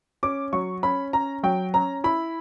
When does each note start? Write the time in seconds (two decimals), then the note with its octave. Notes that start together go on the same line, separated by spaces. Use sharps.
0.23 C#4 D6
0.53 F#3 C#6
0.83 C#4 B5
1.13 C#4 A#5
1.43 F#3 G5
1.74 C#4 A#5
2.04 E4 B5